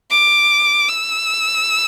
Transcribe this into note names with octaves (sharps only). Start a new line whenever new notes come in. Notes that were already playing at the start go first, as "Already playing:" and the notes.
D6
E6